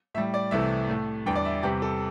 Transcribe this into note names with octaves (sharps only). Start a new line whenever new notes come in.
A2 G3 E5
D5
C2 C3 E3 A3 E5
A2 A3
E2 D3 G3 G5
D5
E5
E2 C3 G3 G4
A4